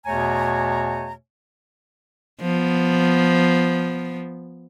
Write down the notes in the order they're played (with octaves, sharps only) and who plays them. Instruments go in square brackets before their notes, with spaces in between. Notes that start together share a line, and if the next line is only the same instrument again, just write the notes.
[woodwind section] E2 B2 A3 C#5 G#5 A#5
[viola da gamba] F3 B3